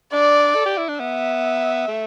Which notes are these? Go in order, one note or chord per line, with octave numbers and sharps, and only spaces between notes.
D4 D5
A4
G4
E4
D4
B3 E5
A3